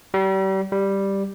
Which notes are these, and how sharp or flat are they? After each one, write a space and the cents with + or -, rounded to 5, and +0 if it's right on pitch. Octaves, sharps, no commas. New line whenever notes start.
G3 -35
G3 +0